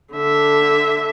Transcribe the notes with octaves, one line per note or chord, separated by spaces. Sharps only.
D3 E5